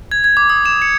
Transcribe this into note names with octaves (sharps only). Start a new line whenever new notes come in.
G#6
G#6
D6
D#6
E7
C#7